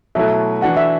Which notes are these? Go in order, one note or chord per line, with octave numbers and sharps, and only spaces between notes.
B2 F#3 A3 E4 E5
E3 D4 F#4 F#5
E5